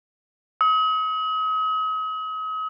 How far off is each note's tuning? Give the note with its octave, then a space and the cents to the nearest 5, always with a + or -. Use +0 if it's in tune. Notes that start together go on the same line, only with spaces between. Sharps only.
D#6 +40